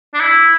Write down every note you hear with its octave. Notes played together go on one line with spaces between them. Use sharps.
D4
E4